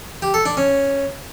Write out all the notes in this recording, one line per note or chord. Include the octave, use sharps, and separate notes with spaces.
G4
A4
D4
C#4